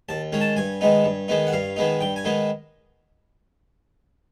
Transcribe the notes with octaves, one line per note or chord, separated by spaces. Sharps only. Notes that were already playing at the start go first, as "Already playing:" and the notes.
D#2 A5
D#3 G#3 C#4
A5
G2 G#5
D#3 G#3 B3 D#4
G2
D#3 G#3 B3 D#4
F#5
G2 F5
D#3 G#3 B3 D#4
G2 G5
G#5
D#3 G#3 B3 D#4